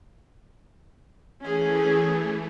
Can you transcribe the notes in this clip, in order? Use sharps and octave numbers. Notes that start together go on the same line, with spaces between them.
E3 A3 C#4 G#4